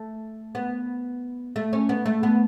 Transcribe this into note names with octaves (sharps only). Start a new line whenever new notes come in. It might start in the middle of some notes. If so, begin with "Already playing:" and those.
Already playing: A3
B3
A3
C#4
B3
A3
B3